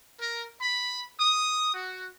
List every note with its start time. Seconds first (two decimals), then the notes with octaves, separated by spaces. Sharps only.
0.20 A#4
0.60 B5
1.19 D#6
1.74 F#4